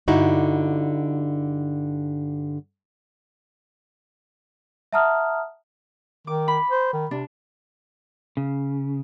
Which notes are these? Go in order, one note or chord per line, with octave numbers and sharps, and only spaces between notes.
G2 D3 D#4 E4 F#4
E5 F#5 A5 A#5 D#6 F6
D#3 D6
B5
C5
D#3
C3 D4
C#3